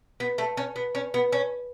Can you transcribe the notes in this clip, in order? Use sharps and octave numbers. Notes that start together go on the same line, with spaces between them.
B3
A3
C#4
B3
C#4
B3
C#4